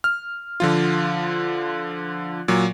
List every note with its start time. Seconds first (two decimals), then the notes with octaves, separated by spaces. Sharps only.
0.04 F6
0.60 D3 F3 F4
2.48 A#2 F#3